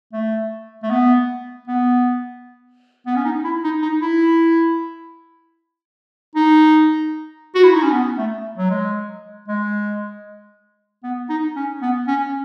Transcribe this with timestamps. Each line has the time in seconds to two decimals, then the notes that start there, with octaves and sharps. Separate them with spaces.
0.13 A3
0.83 A3
0.90 B3
1.68 B3
3.07 B3
3.16 C#4
3.25 D#4
3.44 E4
3.64 D#4
3.82 D#4
4.02 E4
6.36 D#4
7.55 F#4
7.64 E4
7.74 D#4
7.83 C#4
7.92 B3
8.18 A3
8.58 F#3
8.70 G#3
9.48 G#3
11.03 B3
11.30 D#4
11.56 C#4
11.82 B3
12.08 C#4